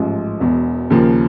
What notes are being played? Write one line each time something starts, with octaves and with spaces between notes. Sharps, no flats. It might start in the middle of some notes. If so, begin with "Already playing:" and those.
Already playing: A1 G#2 F3
E1 E2 B2
D#2 C#3 F3 A#3